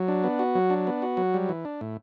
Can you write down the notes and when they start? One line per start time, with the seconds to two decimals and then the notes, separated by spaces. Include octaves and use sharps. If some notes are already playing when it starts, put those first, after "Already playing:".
Already playing: F#3
0.08 D4
0.24 B3
0.39 F#4
0.55 F#3
0.70 D4
0.87 B3
1.02 F#4
1.17 F#3
1.34 G3
1.49 E3
1.65 D4
1.81 A2